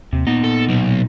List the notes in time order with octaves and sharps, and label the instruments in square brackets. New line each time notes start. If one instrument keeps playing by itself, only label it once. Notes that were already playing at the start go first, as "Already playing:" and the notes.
[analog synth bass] D#2 [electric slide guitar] C3
[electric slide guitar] A#2 D#4 [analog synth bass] B3
[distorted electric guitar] A4
B1